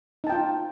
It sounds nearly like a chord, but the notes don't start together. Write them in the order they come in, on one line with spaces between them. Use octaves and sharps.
D#4 A5 G5 F4